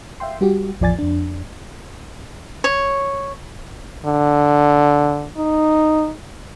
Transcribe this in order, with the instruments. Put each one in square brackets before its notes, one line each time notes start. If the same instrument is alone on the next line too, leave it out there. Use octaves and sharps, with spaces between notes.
[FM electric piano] E5 F5 G5 C6
G3 F#4 G4
A1 E2 F3 D5 G#5 A6
F2 D4
[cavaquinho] C#5
[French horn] D3
D#4